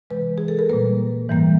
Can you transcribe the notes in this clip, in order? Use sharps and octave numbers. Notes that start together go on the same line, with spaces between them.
C3 E3 G#3 B4
G#4
A4
A#4
A#2 G3 A#3 B4
G#2 E3 G3 A#3